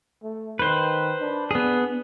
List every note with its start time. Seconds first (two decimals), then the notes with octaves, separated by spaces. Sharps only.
0.23 A3
0.59 D#3 B4 C5
1.21 D4
1.51 B3 G#4